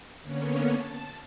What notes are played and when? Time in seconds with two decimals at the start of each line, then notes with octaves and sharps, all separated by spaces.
0.23 D3 A#3 B3 C#4 C#5
0.73 A5